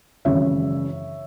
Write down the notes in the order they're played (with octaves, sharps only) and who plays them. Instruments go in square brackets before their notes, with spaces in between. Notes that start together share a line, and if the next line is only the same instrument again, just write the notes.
[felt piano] G#1 F#2 C#3 E3 C#5 E5